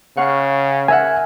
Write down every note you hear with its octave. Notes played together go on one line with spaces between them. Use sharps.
C#3 F5 F#5 C#6
A#4 E5 F#5 G#5